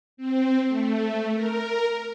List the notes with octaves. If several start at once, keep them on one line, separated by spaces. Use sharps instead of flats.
C4
A3
A#4